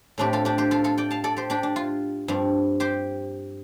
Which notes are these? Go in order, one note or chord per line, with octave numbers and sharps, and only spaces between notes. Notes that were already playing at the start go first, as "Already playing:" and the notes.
A2 A3 C4 D4 G4
F4 A4
D4 G4
G4 C5
F4 A4
F4 A4
D5 G5
F5 A5
A4 D5
G4 C5
D4 G4
D4
F4
G2 F3 C4
G4 C5